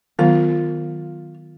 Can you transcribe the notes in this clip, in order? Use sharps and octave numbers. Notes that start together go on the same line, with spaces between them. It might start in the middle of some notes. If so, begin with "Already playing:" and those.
D#3 F#3 B3 F4